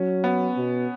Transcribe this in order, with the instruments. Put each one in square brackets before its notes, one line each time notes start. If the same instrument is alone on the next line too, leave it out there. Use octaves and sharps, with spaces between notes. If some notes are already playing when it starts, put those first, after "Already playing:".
Already playing: [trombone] F#3 [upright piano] C#4
[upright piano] B3
[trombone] B2